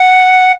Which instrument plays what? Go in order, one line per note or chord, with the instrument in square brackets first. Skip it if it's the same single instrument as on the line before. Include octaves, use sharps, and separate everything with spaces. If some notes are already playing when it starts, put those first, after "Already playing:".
Already playing: [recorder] F#5